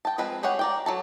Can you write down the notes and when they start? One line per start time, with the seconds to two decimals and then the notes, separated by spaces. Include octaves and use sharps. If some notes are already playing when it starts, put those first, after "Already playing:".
0.05 G5 A5
0.18 F3 G#3 C4 B4
0.43 G4 G#4 C#5 F#5 G5
0.59 A#4 D5 G5
0.86 F#3 A4 A5